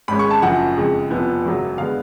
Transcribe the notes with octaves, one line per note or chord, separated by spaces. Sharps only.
G#1 G#2 G#3 C#4 B5
C#6
A5
F#1 F#2 F3 F#5
F2 C#3 G#3
F1 F2 F3 B3
G#1 F#2 C#3 F#3
D3 G#3 B3 F5